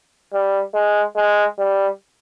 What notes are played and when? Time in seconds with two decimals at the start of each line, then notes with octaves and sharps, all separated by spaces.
0.33 G3
0.74 G#3
1.16 G#3
1.59 G3